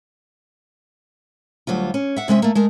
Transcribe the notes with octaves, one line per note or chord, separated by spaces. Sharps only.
D2 F#3 G3 F4
C#4
E5 F#5
C3 G#3 C#4 E5
A3 A#3
G#3 A3 A#4